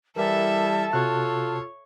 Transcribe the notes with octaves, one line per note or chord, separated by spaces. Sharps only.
E3 G3 A4 A#4 E5 A5
C3 F4 F#4 A4 C#5 F#6